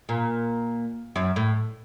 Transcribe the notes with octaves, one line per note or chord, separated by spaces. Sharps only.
A#2
F#2
A2